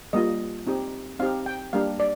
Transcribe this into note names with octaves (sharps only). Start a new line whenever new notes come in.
G3 A#3 F4 D#5
C4 D#4 G4
C4 D#4 G4 F5
G5
G3 A#3 D4 G4 F5
D5